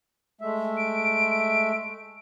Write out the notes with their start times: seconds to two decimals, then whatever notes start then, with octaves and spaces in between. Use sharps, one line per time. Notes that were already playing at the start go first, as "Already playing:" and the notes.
0.41 G#3 A3 E5
0.77 D7